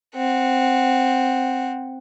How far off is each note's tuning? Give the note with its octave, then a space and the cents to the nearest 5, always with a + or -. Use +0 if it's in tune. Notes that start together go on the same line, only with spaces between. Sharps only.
C4 +0 F#5 -5